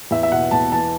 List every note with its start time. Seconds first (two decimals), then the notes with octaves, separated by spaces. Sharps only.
0.11 E2 E5
0.23 E5
0.32 B2 F#5
0.51 E2 A5
0.72 E3 A5